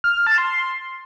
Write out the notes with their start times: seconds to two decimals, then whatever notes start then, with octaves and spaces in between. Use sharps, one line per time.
0.04 F6
0.15 F6
0.27 A5
0.38 C6